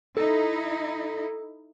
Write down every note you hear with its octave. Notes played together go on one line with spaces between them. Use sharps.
D#4 E4 A4